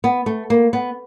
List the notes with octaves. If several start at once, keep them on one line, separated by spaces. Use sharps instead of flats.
B3
A3
A#3
B3